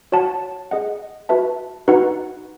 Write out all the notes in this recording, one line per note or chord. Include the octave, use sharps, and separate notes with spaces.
F#4 C#5 F#5 A5
G#4 D#5 F#5
F#4 B4 E5 A5
D#4 F#4 B4 F#5